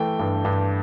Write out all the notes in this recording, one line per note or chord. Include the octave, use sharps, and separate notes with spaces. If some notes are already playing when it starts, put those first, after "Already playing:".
Already playing: E3 A3 G5
G2
G2